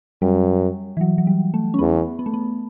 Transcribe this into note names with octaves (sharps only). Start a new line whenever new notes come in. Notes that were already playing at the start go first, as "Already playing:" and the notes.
F#2 G3
E3
F#3
F#3
G3
A3
C#4
E2 B3
B3
A3
B3